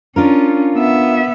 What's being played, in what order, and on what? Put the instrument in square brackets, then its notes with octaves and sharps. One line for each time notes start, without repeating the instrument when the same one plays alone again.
[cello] C#4 [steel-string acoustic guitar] D4 F4 A#4
[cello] B3 E5